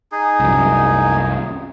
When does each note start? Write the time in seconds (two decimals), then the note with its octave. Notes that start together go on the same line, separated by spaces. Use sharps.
0.12 D#4 G#4
0.40 C2 F#2